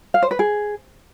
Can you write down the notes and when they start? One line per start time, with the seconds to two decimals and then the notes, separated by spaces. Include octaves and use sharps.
0.14 F5
0.22 C5
0.31 B4
0.39 G#4